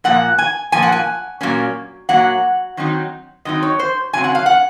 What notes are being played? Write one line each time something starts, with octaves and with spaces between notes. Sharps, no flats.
A#2 F3 A#3 F#5
G#5
A#2 F3 A#3 G#5
F#5
G#5
A#2 F#3 A#3 C#4
A#2 F#3 A#3 F#5
D#3 F#3 C4 D#4
D#3 F#3 C4 D#4 D#5
C#5
C5
C#3 F#3 C4 G#5
F#5
F5
F#5